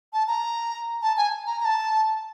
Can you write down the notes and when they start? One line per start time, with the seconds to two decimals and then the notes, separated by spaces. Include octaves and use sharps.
0.13 A5
0.28 A#5
1.02 A5
1.17 G#5
1.47 A#5
1.60 A#5
1.65 A5